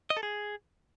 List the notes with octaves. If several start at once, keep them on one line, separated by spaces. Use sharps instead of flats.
D#5
A4
G#4